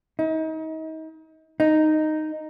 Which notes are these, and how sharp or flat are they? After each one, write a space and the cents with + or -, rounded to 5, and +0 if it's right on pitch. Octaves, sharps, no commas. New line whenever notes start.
D#4 +35
D#4 -5